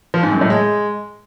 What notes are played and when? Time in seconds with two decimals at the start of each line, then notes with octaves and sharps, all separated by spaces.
0.14 F3
0.23 G#2
0.32 F#2
0.41 A2
0.50 G#3